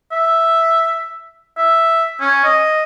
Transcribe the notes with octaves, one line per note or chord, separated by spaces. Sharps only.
E5
E5
C#4
D#5